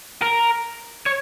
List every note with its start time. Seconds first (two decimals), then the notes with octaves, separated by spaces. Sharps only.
0.22 A#4
1.06 C#5